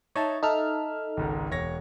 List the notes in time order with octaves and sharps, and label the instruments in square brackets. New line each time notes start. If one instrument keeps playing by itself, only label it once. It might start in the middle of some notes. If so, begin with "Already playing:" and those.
[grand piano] D#4 E5 [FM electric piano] C#5 A5
[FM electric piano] D#4 A4 F6 [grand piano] E5
[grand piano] G#1 C#2 G#2
E1 C#5 A#6